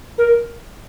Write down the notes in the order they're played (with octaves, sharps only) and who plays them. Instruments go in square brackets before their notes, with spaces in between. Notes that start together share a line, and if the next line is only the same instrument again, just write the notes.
[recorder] A#4